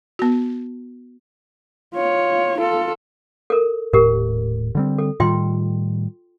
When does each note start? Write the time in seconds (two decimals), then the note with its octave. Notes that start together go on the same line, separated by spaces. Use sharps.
0.19 B3 F#4
1.94 F4 C#5
2.58 F4 A4
3.50 A4 A#4
3.93 D#1 A2 G4 A#4
4.75 D3 G3 C4
4.98 A4
5.20 A2 D#3 G3 F4 G5 C6